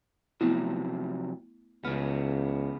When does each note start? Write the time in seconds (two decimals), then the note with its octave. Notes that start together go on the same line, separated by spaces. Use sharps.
0.41 C3 F3 F#3 A3 B3 E4
1.85 C#2 C#3 B3 F6